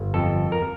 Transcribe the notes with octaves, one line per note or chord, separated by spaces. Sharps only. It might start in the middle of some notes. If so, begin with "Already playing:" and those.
Already playing: G1
F2 A4
A#4